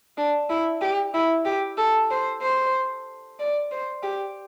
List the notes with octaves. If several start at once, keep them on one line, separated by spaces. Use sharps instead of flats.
D4
E4
G4
E4
G4
A4
C5
C5
D5
C5
G4